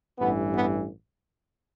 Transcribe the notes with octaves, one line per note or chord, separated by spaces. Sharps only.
A1 G2 E3 B3
B3